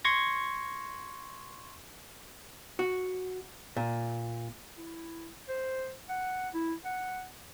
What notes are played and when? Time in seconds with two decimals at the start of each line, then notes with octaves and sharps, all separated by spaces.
0.05 C6 C#6 G#6 A#6
2.79 F#4
3.77 A#2
4.77 E4
5.49 C5
6.09 F#5
6.54 E4
6.85 F#5